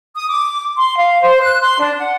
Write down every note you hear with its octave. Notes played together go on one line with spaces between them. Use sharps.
D#6
D6
C6
F5
C5
F#6
C6
D4
F#5